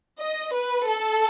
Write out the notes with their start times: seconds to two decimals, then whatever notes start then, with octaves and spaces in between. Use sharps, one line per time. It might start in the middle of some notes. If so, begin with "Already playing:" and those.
0.19 D#5
0.54 B4
0.89 A4